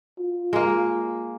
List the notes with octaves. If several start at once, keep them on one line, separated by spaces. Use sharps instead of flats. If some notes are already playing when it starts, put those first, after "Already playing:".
F4
G#3 A#3